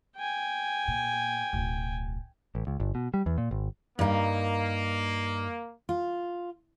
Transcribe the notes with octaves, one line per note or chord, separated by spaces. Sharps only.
G5 G#5
A#2
D1 B1
A1
C#2
G1
B2
G3
E2
A#2
G#1
G2 A#3 D#4
F4